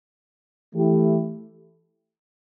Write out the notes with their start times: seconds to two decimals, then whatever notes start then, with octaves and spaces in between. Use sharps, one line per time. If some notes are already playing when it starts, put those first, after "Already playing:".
0.74 E3 A3 E4 G4